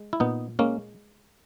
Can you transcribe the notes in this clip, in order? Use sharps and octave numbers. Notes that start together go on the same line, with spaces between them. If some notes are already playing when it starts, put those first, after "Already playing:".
Already playing: G#3
E4
A#2 B3 D#4
G#3 A#3 C#4